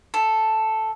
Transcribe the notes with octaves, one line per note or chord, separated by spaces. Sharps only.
A4